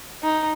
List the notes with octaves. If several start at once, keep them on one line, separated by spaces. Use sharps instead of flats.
D#4